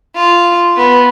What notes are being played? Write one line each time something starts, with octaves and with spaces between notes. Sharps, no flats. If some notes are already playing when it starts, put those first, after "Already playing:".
F4
B3